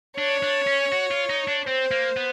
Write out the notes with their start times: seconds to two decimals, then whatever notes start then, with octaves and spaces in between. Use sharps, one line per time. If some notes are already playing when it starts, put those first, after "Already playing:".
0.18 D4 C#5
0.43 D4
0.67 C#4
0.92 F#4
1.11 F4
1.30 D#4
1.48 D4
1.66 C4 C5
1.91 A#3
2.17 B3